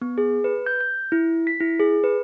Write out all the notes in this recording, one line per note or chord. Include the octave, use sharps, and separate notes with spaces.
B3
G#4
B4
G6
G6
E4
B6
E4
G#4
B4